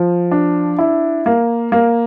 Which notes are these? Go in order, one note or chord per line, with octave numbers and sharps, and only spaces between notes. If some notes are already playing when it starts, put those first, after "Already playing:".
Already playing: F3
D4
E4
A#3
A#3